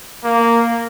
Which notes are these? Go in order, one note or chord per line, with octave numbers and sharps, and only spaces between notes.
A#3